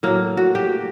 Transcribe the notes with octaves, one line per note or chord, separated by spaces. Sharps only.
A2 F#3 A#3
F#4
G4